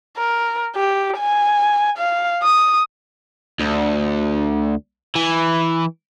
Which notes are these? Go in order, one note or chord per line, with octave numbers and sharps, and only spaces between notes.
A#4
G4
G#5
F5
D#6
D2
E3